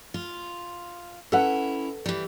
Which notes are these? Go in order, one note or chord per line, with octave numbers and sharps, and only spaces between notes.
F4
C#4 E4 A4 B4 F#5
E3 G3